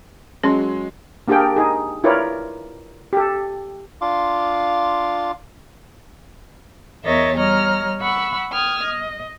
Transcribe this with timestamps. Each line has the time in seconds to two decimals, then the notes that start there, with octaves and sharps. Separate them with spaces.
0.43 F#3 G#3 C#4 C6
1.28 A#3 D4 G4 G#4 A#4 G5
1.56 D#4 G#4
2.04 E4 F4 A#4 B4 C#5 D5
3.13 G4 A4
4.01 D4 F4 F5 C6 D6
7.05 E2 A#4 C#5 D#5 E5 A6
7.37 G3 C#5 D#5 A#5 F6
8.01 F#5 B5 C#6 E6
8.52 G5 D#6 F6 G#6
8.83 D#5